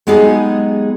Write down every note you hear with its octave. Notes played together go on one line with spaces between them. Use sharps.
F#3 G#3 B3 D#4 G4 G#4